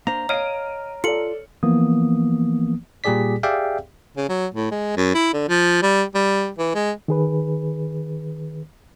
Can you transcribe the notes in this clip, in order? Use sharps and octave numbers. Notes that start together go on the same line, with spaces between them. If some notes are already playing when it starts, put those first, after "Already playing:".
A#3 D4 C5 A#5
C#5 D#5 F5 F6 D7 D#7
F4 A4 D5 C#7 F#7
E3 F3 A#3 B3 D#6
A#2 G3 G4 G#4 D5 B6
G4 G#4 D5 E5 F5 G5
C#3
F#3
A2
G#3
F#2
E4
D3
F3
G3
G3
E3
G#3
D#3 G#4 B4